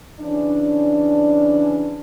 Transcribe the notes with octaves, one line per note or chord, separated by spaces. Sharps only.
C#3 E3 C#4 D4